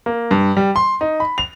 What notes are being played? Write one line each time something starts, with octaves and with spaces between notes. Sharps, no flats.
A#3
G2
G3
C6
D#4
B5
F7